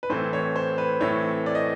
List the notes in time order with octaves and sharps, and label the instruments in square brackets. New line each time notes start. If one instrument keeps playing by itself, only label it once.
[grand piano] B4
A2 E3 A3 C4 C5
C#5
C5
B4
A2 E3 A3 C4 C#5
D5
D#5